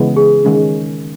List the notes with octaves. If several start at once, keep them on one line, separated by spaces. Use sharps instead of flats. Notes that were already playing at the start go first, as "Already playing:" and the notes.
Already playing: C#3 E3 G#3 B3
G#4
D#3 G#3 C#4